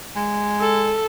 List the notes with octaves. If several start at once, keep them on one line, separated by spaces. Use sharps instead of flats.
G#3
A4